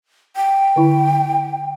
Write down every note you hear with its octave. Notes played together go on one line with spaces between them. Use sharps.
G5
D3 E4 B5